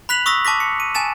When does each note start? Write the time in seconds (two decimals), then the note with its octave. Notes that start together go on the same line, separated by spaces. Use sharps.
0.09 B5 F#6 B6 F7 F#7
0.26 C#6 D#6 E6 A#6 B6
0.45 A5 D6 A#6 B6
0.60 C#7
0.80 D#7
0.95 G#5 A5 A6 E7